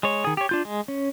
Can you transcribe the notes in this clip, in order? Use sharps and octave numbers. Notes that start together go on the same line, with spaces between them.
G#3 C#5
D#3 G#4
G4 C#5
D4 F4 G6
G#3
C#4